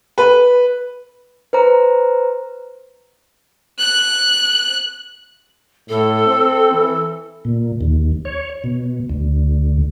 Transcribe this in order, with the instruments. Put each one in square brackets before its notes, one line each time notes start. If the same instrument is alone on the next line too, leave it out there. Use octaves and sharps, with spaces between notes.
[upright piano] B4
[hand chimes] B4 C5 A#5
[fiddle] F#6
[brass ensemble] A2 [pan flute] A4
[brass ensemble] C4
E3
[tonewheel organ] A#2
D#2
C#5
B2
D2